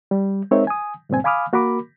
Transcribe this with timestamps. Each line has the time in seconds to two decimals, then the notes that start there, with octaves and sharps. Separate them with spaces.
0.11 G3
0.51 G#3 C4 D#4 A#4 C#5 E5
0.67 G#5 D#6
1.09 C#2 G2 A#2 C4 G#5
1.24 F5 G#5 B5 D6 D#6 F6
1.53 A#3 F#4 A#4 B5 D6